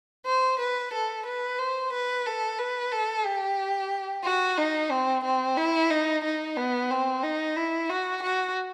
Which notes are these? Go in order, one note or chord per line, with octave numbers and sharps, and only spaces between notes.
C5
B4
A4
B4
C5
B4
A4
B4
A4
G4
F#4
D#4
C4
C4
E4
D#4
D#4
B3
C4
D#4
E4
F#4
F#4